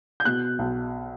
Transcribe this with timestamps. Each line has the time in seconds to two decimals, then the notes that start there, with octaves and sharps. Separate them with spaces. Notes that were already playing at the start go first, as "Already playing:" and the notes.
0.20 G6
0.25 B2 F#6
0.59 B1